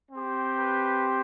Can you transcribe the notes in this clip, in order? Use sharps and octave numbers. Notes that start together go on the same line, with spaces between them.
C4 G4
B4